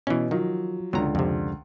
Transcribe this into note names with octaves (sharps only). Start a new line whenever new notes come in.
B2 E3 C#4
D#3 F3 F#3
C#2 D3 F#3 A#5
F2 C3